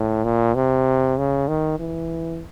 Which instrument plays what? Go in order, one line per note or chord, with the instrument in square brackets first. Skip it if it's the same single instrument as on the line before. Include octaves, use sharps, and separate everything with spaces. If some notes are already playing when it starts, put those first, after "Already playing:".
Already playing: [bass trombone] A2
A#2
C3
C#3
D#3
E3